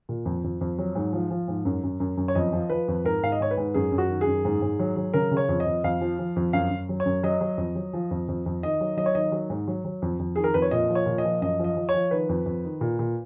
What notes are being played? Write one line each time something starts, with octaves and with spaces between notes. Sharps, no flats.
A#2
F2
F2
F2
F#3
G#2
F3
F3
G#2
F#2
F#2
F#2
F#2
C#5
F2 D#5
F3
F3 B4
F2
G#2 A#4
G#2 F5
D#5
G#2 C#5
B4
G#2
F#2 G#4
F#2
F#4
D#3
G#4
F#2
G#2
G#2
F#3
F#3
C#3 A#4
C#3
C#5
F2
D#5
F2
F2 F5
F3
F3
F2
F#2 F5
F#2
F#3
C#5
F#2
F#3 D#5
F#3
F2
F#3
F3
F2
F2
F2
D#3 D#5
F#3
F#3 D#5
C#5
D#3 D#5
F#3
G#2
F#3
F#3
F2
F2
D#3 G#4
A#4
F2 B4
C#5
A#2 D#5
F3
C#5
A#2
D#5
F3
F#2 D#5
F3
D#5
F3
C#5
F3
D#3 B4
F2
F2
D#3
A#2
A#2